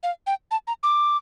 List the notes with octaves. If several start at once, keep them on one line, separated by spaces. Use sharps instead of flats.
F5
G5
A5
A#5
D6